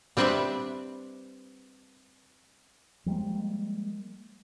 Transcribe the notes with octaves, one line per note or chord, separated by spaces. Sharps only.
G3 C4 D4 B4 D5 E5
F3 G3 G#3 A#3